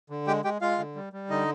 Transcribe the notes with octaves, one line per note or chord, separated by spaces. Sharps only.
D3
G#3 G4 G5
G#3 G4 G5
G#3 F4 F5
D3
G3
G3
D3 D#4 D#5